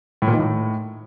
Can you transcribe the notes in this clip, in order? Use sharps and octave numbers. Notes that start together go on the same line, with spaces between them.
A2
A#2
D#3
A2